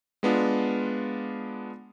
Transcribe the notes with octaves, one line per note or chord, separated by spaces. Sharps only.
G#3 B3 D4 F4